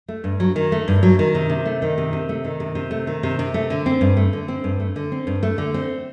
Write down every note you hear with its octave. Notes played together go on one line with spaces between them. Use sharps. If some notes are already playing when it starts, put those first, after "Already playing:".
A3
G2
F#3
D#3
A3
G2
F#3
D#3
C3
C3
A3
D#3
C3
C3
A3
D#3
C3
C3
A3
D#3
C3
C3
A3
D3
C4
G2
A3
D3
C4
G2
A3
D3
C4
G2
A3
D3
C4